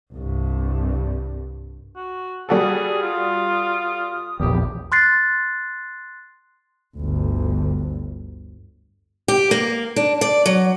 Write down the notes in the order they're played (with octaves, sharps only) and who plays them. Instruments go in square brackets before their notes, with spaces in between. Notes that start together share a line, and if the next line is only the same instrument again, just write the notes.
[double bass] C2 G2
[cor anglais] F#4
[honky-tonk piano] G3 F#4 A4 [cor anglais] G#4 [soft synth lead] D#6
[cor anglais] F4
[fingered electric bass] A#1 E2 [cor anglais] G4
[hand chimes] C6 F#6 A6 C7
[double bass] G1 D2
[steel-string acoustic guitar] G4
A#3
D4
D5
F#3